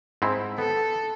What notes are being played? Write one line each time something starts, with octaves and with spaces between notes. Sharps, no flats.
G#2 C4 E4
B3 A4